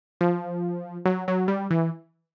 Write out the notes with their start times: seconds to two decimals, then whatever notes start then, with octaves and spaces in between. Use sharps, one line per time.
0.21 F3
1.05 F#3
1.28 F#3
1.48 G3
1.71 E3